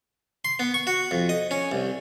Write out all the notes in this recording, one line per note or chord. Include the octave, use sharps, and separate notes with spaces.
C6
B3
C#6
F#4
F2
D#5
C#4
C2